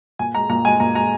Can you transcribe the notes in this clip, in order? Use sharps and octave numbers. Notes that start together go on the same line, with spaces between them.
A#2 G#5
G#3 A#5
A#2 A#5
G#3 G#5
A#2 A#5
G#3 A#5